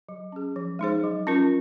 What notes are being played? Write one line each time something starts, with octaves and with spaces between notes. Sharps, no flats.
F#3
C#4 G#4
F3
G#3 D#4 G#4 C5
F#3
C#4 F4 A#4